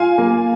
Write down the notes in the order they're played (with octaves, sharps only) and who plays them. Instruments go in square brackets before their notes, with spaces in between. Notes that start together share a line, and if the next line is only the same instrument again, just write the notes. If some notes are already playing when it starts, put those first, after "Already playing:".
Already playing: [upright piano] F4 [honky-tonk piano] F5 G#5
[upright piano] A#3